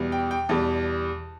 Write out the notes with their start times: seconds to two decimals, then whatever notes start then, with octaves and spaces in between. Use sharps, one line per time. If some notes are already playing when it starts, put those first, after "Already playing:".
Already playing: E2 B2 G3
0.12 G5
0.31 G5
0.49 E2 B2 G3 A5